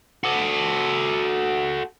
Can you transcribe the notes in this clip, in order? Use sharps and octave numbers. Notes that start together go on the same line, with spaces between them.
F#4 A4